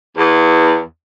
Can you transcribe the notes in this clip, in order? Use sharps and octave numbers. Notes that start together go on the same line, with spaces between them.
E2